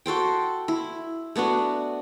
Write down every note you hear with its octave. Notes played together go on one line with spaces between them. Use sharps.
F#4 A4 C5 G5
E4
A3 B3 D4 F#4